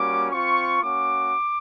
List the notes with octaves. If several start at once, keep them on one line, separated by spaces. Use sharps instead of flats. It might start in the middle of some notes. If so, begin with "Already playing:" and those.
Already playing: G3 A#3 C#4 F#4 D6
C4 F4 C#6
A#3 C#4 F#4 D6